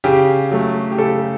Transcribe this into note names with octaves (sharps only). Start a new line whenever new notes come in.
C#3 G4
F#3 A3
G4
C#3 A4